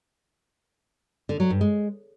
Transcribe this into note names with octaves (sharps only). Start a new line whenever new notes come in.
D3
F#3
G2
G#3